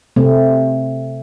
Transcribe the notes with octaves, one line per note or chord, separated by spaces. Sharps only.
C3 A3 C4